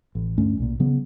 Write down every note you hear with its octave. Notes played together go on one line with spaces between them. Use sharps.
A1
D2 G2 A3 C#4
B1 A#2
C#3 F#3 B3